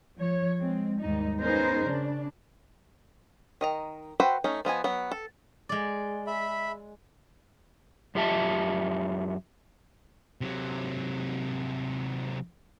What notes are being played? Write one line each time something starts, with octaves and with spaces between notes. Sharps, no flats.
F3 C#5
G#3 C4
D#2 G#2 G3 D#4
B3 C#4 D#4 G#4 A#4 C5
C#3 D4
D#3 D#5 A#5
F#4 B4 C5 E5 G5
A3 C#4 D#4
F3 B3 D#5 G#5
F#3 B3
A4
G#3 D5
E5 B5
F#2 F4 G4 E5 A5
C3 F#3